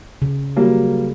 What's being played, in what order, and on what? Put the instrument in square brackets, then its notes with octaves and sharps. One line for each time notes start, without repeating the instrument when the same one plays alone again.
[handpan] C#3
[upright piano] F#3 G3 A#3